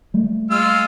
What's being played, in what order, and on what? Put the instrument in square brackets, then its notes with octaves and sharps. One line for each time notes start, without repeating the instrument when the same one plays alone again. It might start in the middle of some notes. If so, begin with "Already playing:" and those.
[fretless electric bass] G3 A3 A#3
[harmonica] G#3 F4 F6 [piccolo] E6